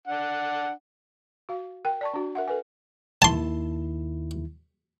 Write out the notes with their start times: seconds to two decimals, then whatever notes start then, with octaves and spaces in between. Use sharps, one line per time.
0.08 D4 F#5
1.49 F#4 F5
1.85 A#4 G5
2.01 D5 A5 C#6
2.14 D4 F#4
2.35 A#4 E5 F#5
2.48 A4 B4 G#5
3.22 D#2 D#3 E4 A5 C6